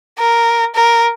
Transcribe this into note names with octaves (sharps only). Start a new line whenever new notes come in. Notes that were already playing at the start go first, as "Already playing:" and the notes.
A#4
A#4